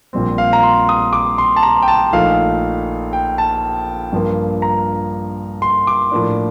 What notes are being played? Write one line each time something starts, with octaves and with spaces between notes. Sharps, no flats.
A#1 A#2 G3 C4
F5
A#5
C6
D#6
D6
C6
A5
A#5
G5
A5
A#1 A#2 A3 D#4 F5
G5
A5
G2 F3 A#3
A#5
C6
D6
A2 F3 A#3 D4